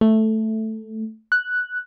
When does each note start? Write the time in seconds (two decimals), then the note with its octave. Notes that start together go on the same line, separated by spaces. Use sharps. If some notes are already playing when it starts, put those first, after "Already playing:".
0.01 A3
1.32 F#6